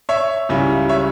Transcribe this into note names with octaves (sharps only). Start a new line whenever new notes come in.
C#5 E5
C#2 C#3 G3 C#4 E4
C#5 E5